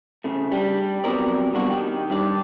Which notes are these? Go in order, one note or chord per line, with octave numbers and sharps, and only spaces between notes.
C#3 A3
G3 D4
F2 F#3 B3 A#4 D5
G2 B2 A#3 D4 F#4
D#3 G4
G2 D4 D5